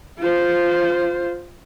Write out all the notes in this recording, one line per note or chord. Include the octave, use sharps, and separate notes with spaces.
F4 C5